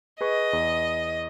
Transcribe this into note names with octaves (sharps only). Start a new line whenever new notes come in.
G#4 B4 D#5 C#6
E2